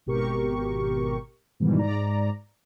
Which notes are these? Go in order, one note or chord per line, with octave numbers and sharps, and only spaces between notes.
G#1 B2 G4 A#4 C#6
G#2 B2 D#3 E3 G3
G#2 D5 A#5